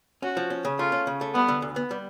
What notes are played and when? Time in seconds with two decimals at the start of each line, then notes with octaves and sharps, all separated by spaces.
0.22 C#4 F#4
0.37 F3
0.50 C#4
0.65 C#3
0.79 A3 F4
0.92 C#4
1.07 C#3
1.21 A3
1.34 G3 B3
1.48 D3
1.62 D2
1.76 B3
1.91 G3